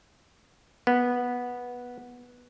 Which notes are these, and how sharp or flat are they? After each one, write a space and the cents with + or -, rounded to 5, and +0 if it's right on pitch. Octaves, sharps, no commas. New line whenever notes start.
B3 -10